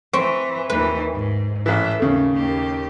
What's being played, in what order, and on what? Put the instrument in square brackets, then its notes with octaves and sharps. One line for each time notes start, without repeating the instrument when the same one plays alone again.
[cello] E3 [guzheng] C4 [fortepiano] C#6
[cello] D#2 E3 [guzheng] B4
[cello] G#2
[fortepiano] A1 E3 [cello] E5
[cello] D#2 [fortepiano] C#3 A3
[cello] D#2 G4